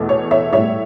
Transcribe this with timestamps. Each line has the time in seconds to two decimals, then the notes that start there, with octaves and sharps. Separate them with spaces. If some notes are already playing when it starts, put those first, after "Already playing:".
Already playing: E2 B2 A3
0.09 C#5
0.31 C#5 E5
0.53 A2 G3 C#5 E5